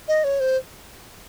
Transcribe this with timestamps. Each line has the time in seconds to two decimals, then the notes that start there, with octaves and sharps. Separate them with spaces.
0.08 D#5
0.24 C#5
0.40 C5